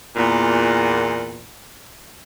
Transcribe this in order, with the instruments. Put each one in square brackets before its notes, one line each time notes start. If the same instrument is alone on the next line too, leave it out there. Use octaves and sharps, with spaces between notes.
[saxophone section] E2 A#2